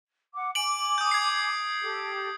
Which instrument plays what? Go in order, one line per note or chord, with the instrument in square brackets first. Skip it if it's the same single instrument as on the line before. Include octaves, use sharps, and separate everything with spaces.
[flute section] F#5 D6
[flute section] G#5 D6 [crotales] D7 F#7
[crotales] D#6 G6
G#6 C7
[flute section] G4 A4